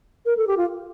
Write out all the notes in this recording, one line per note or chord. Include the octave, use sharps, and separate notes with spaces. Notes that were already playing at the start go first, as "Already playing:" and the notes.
A#4
A4
G4
F4